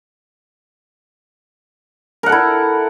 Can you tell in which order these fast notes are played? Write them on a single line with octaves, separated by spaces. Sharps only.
A#4 F#5 A4 E4